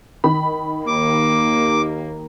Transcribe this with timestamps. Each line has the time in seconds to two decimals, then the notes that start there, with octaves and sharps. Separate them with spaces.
0.24 D#3 B5
0.87 D#2 A#3 D6